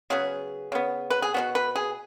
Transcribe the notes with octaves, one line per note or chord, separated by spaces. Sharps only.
C#3 F#3 B3 G#4
C#3 B3
B4
G#4
B2 F#3 B3 F#4
B4
G#4